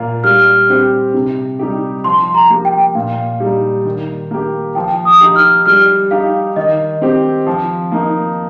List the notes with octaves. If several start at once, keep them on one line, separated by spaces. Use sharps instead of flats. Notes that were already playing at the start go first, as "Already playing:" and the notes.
Already playing: A#2 A#3 F4
G3 F6
C4 G4
C3
G3 D#4 G4
F3 C6
A#5
A#3 G4
G5
A#2 F5
G3 D#4
D#3
A#3 G4
F3 G5
D#6
D#4 G4
F6
G3 F6
D#4 G4 F5
D#3 D#5
C4 G4
F3
A#3 D#4